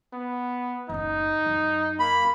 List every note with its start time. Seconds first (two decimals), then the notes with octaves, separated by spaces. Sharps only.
0.13 B3
0.89 F#1 A2 D#4
1.46 F#2
2.00 A#3 B5